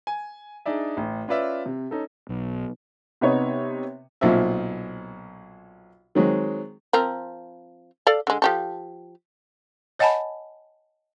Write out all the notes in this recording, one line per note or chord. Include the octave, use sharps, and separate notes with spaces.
G#5
D4 D#4 G#4 D5 E5
A1
C#4 F4 B4 D5 E5
C3
C#4 D#4 A4
B1
C3 B3 D#4 C#5
B1 A#2 F3 C4 E5
D#3 F#3 G#3 C4
F3 C4 A#4
A4 D5 F5
D3 G#3
F3 G4 A4
C#5 D#5 F#5 G#5 A5 B5